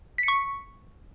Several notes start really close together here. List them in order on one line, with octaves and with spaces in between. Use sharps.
B6 C#7 C#6